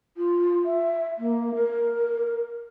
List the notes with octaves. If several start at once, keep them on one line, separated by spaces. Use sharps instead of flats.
F4
E5
A#3
A#4